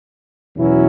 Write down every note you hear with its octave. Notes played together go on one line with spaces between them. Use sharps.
E2 B2 F#3 C#4 E4